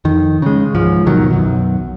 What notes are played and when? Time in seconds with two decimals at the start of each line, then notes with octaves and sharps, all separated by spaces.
0.05 F2 D#3
0.42 C#3 G#3
0.74 C#2 G#2 F3
1.06 D#2 B2 D#3 F#3
1.30 B1 F#2